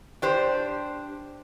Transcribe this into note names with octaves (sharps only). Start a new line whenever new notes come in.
D4 G4 C5